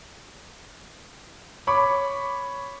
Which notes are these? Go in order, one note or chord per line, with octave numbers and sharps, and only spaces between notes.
C#5 B5 C#6 D6